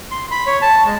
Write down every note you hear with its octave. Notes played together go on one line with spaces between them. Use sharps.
C6
B5
C#5
A5
G#3